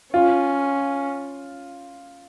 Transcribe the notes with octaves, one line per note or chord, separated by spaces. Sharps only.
C#4 F4